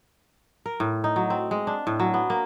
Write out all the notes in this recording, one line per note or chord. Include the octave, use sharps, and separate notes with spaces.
A#4
A2
D#4
F#3
C4
G#3
D4
A2
F#3
B3
A#3